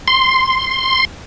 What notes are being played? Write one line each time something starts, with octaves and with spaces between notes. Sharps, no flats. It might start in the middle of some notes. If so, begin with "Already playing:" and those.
C6